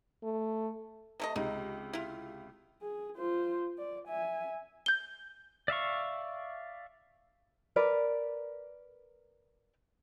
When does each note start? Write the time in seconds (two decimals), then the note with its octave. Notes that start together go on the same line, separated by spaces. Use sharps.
0.23 A3
1.20 C3 A3 D#5
1.36 C#2 C3 D#4
1.93 E4 F4
2.81 G#4
3.16 F4 C5
3.78 D5
4.07 E5 G#5
4.86 G6 G7
5.68 D5 E5 F5 C#6
7.76 A#4 B4 D5